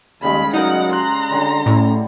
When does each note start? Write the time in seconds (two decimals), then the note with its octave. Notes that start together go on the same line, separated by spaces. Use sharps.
0.23 D#2 C#3 G3 G#3 B5
0.53 F#3 D#4 A#4 F#5
0.93 A#5 C6 F#6
1.31 D3 F#3 G3
1.66 A2 C#4